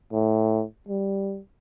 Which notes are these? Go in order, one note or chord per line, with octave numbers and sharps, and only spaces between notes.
A2
G3